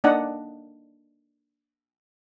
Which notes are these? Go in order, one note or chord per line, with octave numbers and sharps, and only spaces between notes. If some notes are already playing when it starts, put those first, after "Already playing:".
A#3 D4 D#4 D5 D#5 F#5